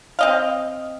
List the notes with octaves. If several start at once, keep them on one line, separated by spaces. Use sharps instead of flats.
C4 D#5 F5